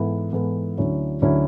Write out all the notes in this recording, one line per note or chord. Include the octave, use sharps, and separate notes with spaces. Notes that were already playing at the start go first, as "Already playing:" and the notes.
Already playing: G#2 E3 B3 E4 A4
G#2 E3 B3 E4 A4
D2 D3 F#3 C#4 E4
D2 D3 F#3 C#4 E4